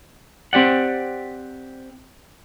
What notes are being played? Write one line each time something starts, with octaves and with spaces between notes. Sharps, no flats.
C4 G4 D5 F#5